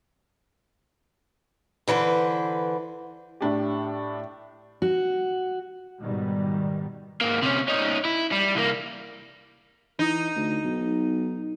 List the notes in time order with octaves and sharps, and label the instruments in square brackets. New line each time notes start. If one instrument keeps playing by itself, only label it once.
[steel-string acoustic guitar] D3 E3 B4 C5
[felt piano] A2 D4 G4
[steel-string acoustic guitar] F#4
[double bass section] G#2 B2 D#3 G3
[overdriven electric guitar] G#2 A#3
C3 C#4
C#4 D#4
E4
G3
C2 A#3
[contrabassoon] E3 [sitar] D#4
[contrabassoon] D2
B1